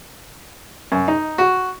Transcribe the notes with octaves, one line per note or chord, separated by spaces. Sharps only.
F#2
D#4
F#4